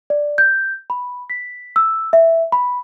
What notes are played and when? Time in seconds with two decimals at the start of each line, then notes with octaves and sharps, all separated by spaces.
0.10 D5
0.38 G6
0.90 B5
1.30 B6
1.76 E6
2.13 E5
2.52 B5